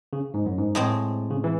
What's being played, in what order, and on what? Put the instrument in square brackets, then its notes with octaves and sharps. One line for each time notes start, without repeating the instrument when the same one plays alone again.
[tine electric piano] C#3
G#2
F#2
G#2
[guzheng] A2 G#3 C4
[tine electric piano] C#3
E3